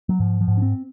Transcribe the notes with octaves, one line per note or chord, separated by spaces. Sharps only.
F#3
G#2 F3
F3
G#2
C#4
C4